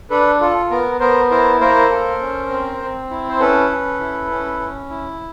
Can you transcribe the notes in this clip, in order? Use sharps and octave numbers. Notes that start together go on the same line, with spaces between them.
D4 A4 B4
F4 A4
B3 A#4
B3 A#4 C5
E4 A#4 C5
A#3 A#4 C5
A4
C#4
C4
C4
E4
C5
C#4 A4 B4
C#4
E4
C#4
C#4
E4